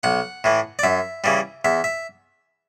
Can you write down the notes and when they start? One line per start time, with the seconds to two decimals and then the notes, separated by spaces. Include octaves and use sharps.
0.03 B1 F#5
0.44 A2 E3
0.79 D5
0.83 F#2 E5
1.24 C#3 E3 G3
1.65 E2 E5
1.84 E5